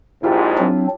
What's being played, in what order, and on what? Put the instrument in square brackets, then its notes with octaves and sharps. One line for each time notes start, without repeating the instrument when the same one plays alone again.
[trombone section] A#1 G#2 [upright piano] E4 F4 G4
[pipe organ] F#3 C4 D4